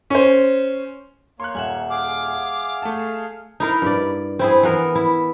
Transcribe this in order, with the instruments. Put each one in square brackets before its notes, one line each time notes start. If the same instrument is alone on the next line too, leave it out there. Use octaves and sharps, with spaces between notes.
[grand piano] C#4 C5
[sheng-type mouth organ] A#3 C#5 [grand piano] C6 F#6
[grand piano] D#1 [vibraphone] E5 F#5 G#5
[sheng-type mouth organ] G#4 F5 [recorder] D6
[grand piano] A3 A5
[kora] D#4 E4 A#4
G2 D5
C4 E4 G#4
E3 B3 A#4
E4